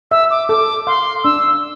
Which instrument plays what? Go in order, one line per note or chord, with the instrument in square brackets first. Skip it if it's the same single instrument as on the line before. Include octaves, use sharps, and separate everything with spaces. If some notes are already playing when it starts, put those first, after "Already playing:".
[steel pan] E5 [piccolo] E6
[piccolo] D6
[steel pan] A4 [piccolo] D6
[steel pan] F5 [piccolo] C6
[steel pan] D4 [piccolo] E6